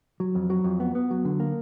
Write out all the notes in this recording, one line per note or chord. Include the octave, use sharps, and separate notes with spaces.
F#3
F2
F#3
F2
B3
B3
F#3
D3
A#3